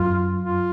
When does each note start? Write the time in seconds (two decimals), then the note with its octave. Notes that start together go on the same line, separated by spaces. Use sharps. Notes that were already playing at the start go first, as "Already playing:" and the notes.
Already playing: F#2 F4
0.41 F4